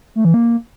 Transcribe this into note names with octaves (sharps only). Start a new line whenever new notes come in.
A3
E3
A#3